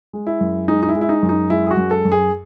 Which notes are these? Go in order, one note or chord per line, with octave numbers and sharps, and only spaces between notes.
G#3
E4
F#2
G#3 D#4
D#4
E4
G#3
E4
D#4
F#2
D#4
G#3 E4
G#4
F#4
F#2
A4
F#2
G#4